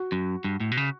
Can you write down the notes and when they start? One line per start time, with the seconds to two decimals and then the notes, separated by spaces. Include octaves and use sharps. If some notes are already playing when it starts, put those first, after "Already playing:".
Already playing: F#4
0.12 F#2
0.44 G2
0.60 A2
0.72 B2
0.77 C#3